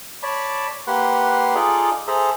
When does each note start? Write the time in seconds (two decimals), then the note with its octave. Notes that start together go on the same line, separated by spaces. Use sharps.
0.23 C#5 D5 A5 B5
0.87 A#3 G4 B4 F#5 C6
1.55 D#4 F4 G#4 A4 D5
2.08 G#4 A4 C5 E5 A#5